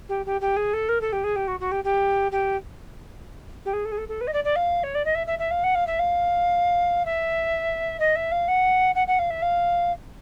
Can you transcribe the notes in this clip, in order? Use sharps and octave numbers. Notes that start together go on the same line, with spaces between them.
G4
G4
G4
G#4
A4
A#4
A4
G4
G#4
G4
F#4
F#4
G4
G4
G4
G4
G#4
A4
G#4
A4
A4
B4
D#5
D5
D5
F5
C#5
D5
D#5
E5
E5
E5
F5
F#5
F5
E5
F5
E5
D#5
E5
F5
F#5
F#5
F#5
F5
E5
F5